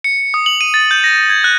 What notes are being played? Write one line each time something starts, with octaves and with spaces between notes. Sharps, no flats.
C#7
D#6
F#7
D#7
A6
G6
A#6
G#6
F#6